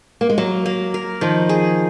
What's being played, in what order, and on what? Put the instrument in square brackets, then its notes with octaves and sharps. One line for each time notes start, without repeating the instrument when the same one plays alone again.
[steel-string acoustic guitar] A#3
G#3
[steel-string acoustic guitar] F#3 [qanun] A#3
[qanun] A#3
A#4
[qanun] D#3 [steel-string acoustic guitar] F3
[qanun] G#4